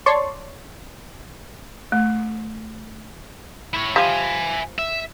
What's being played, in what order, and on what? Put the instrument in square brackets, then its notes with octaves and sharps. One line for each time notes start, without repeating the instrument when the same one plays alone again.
[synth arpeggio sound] C#5 D5 A5 C6 C#6
[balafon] A3
[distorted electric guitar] E4 C#5
[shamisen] F3 G3 [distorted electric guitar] E5 G#5
[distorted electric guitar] E5